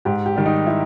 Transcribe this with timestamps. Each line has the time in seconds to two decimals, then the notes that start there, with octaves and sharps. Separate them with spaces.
0.05 G#2 G4
0.26 G4
0.36 D#3 G3
0.46 D#4
0.67 E4